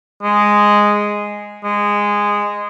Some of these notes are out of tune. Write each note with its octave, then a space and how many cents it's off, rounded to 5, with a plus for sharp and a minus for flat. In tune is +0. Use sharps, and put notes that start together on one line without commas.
G#3 -5
G#3 -15